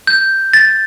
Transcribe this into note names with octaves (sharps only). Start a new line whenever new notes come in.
G6
A6